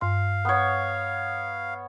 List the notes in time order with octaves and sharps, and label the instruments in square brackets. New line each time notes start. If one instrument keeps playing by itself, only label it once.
[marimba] G2 C6 [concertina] F5
[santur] B3 C#5